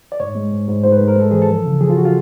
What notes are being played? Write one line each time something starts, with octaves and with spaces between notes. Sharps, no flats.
D5
G#2 C#5
G#3
G#2
G#2
G#2 C5
B4
G#2
A#4
G#3 A4
E3 G#4
A4
F3
C#3
F3 G#4
F4
F#4
F4